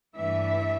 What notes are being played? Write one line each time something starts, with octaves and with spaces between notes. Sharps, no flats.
G2 E3 A3 D4 E5